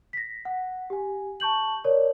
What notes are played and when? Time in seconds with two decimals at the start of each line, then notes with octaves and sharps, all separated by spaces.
0.13 A#6 B6
0.45 F#5
0.90 G4 G#5
1.40 A5 C#6 G6 F#7
1.84 A#4 C#5 D5